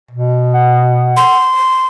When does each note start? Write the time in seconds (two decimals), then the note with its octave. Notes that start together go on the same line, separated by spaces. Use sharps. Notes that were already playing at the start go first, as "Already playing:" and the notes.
0.11 B2
0.54 F#5
1.17 C6